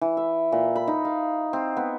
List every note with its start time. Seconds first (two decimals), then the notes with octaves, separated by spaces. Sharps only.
0.01 E3
0.17 E5
0.52 A#2
0.75 B5
0.87 D#4
1.05 F5
1.53 C4
1.77 B3